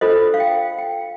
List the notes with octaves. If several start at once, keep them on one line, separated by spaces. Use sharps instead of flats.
D4 F4 A4 C5 D#5
F5
G5
G5